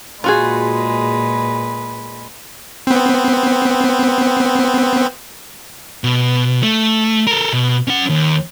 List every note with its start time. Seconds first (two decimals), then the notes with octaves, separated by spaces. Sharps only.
0.24 A#2 G#3 F4 F#4 G#4 B4
2.87 B3 C4
6.04 B2
6.63 A3
7.27 A4 A#4
7.53 B2
7.88 C#4 F#5
8.09 D#2